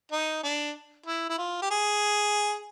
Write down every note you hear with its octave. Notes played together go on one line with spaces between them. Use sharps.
D#4
D4
E4
E4
F4
G4
G#4